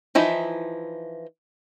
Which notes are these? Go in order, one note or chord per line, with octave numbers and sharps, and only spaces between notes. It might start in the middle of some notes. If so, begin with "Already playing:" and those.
E3 F3 D#4 E4